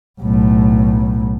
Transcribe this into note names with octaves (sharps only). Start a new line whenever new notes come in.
B1 A2